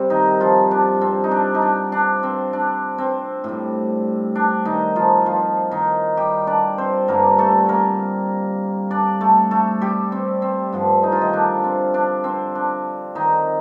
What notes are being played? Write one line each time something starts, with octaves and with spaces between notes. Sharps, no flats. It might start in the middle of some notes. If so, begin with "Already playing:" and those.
Already playing: C3 G3 C4
D#3 D#4
F3 F4
D4
C4
D#4
D4
D#4
D4
D4
C4
D4
C4
A2 G3
D4
D#3 D#4
F3 F4
F3 F4
D#3 D#4
G3 G4
D4 D5
C4 C5
G2 D3 G3 A#3 A#4
A3 A4
A#3 A#4
D4 D5
A3 A4
A3 A4
G3 G4
C4
C4
G2 D3 F3
D#4
F4
D#3 D#4
D4
C4
D4
C4
D4
D#3 D#4